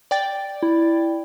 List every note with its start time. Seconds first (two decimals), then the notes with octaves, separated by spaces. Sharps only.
0.11 D5 G5 A6
0.63 E4